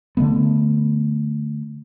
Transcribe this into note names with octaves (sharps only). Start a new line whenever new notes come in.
D3 D#3 A3 B3